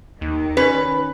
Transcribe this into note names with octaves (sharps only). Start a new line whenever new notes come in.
D#2 D#3
C#4 B4